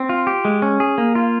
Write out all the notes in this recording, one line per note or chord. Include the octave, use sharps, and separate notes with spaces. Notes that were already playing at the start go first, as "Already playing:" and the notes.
Already playing: C4
F4
G4
G#3
C#4
G#4
A#3
F4